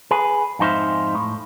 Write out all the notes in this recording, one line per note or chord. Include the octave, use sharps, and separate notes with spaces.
G#4 B4
F2 G#2 D#4 C5 E5 F5
A2